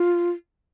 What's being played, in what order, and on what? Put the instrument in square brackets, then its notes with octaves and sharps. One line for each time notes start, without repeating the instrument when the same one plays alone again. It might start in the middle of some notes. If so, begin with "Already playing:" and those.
Already playing: [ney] F4